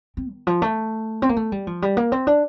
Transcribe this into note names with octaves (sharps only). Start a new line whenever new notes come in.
C4
D#3
F3
A3
C4
A#3
A3
G3
F3
G3
A#3
C4
D4